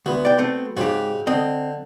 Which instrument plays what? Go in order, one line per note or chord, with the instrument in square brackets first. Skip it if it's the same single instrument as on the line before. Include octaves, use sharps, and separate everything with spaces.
[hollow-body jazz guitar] D2 [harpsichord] B3 F#4
[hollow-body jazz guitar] D5 G5
A3 C4
[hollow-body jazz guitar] G#2 G4 [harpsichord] C#3 C4 F#4
[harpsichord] D3 [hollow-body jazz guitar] C4 D#5